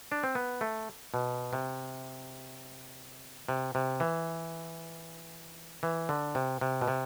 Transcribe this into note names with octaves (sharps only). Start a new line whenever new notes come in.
D4
C4
B3
A3
B2
C3
C3
C3
E3
E3
D3
C3
C3
B2
C3